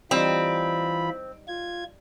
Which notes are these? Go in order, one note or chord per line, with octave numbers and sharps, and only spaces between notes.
E3 G3 C4 D#4 F4 B5
F4 G#6